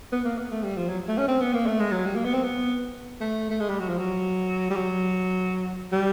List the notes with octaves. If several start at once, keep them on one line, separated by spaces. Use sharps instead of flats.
B3
A#3
B3
A3
G3
F3
F#3
A3
C#4
C4
B3
A#3
A3
G#3
F#3
G3
A#3
B3
C4
B3
A3
A3
G#3
G3
F#3
F3
F#3
G3
F#3
G3